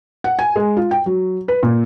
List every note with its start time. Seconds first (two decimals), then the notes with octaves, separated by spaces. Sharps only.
0.24 F#5
0.39 G#5
0.56 G#3
0.77 F4
0.91 G5
1.06 F#3
1.48 B4
1.63 A#2